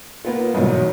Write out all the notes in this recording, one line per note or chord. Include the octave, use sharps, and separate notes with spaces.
A#3 B3 F4
G1 G#2 B2 E3 F#3